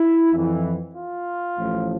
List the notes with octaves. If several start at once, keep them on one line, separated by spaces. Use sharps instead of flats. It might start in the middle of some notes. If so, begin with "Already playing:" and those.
Already playing: E4
F2 E3
F4
A1 A2 F3